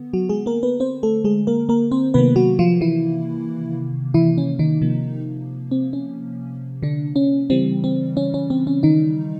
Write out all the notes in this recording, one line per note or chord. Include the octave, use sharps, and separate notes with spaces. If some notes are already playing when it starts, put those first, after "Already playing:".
Already playing: D3 B3
F#3 F#4
G#3 G#4
A#3 A#4
B3 B4
C4 C5
A3 A4
G#3 G#4
A#3 A#4
A#3 A#4
C4 C5
C3 D#3 F#3 A#3 B3 B4
F#3 F#4
F3 F4
E3 E4
E3 E4
C#4
D#3 D#4
C3 F3 A#3
C4
C#4
D3 D4
C#4
C#3 E3 G3 C4
C4
C#4
C#4
C4
C#4
D#3 D#4